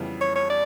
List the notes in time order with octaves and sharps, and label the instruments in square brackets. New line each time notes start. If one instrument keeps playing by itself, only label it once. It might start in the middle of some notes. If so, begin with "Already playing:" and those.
Already playing: [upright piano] F2 C#3 E3 G3 B3
[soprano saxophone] C#5
C#5
D5